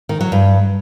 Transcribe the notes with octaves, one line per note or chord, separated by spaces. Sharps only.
D#3
F#3
G2